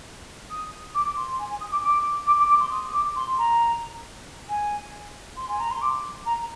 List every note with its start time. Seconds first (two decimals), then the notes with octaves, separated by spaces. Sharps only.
0.50 D#6
0.94 D6
1.16 C6
1.39 G#5
1.49 G#5
1.60 D#6
1.71 D6
1.83 D6
2.26 D6
2.38 D6
2.49 D6
2.60 C6
2.71 D#6
2.93 D6
3.16 C6
3.38 A#5
4.48 G#5
5.37 C6
5.48 G#5
5.59 A#5
5.70 C6
5.81 D6
6.25 A#5